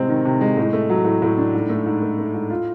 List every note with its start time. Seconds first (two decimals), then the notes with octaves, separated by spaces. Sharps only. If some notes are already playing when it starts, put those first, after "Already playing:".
Already playing: A2 C3 G#3 C4
0.09 D#3
0.25 C3
0.41 G#3
0.57 A2
0.73 A3
0.89 F#3
1.05 A2
1.22 A2
1.38 D4
1.54 G#2
1.70 A3
1.86 G#2
2.02 A3
2.19 A3
2.35 G#2
2.50 F4